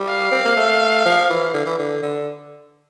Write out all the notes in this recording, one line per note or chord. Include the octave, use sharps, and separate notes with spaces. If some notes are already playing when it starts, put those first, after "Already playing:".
Already playing: G3
F5
C4
A#3
A3
F3
E3
D3
E3
D3
D3